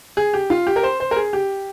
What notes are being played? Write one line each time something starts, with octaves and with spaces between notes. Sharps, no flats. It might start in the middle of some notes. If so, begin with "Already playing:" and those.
G#4
G4
F4
G4
A#4
C5
C5
A#4
G#4
G4